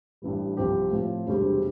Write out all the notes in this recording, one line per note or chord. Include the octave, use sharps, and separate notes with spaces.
A1 G2 E3 G3
C2 C3 F3 C4 G4
A2 F3 C4 F4
E1 D2 C3 G3 C4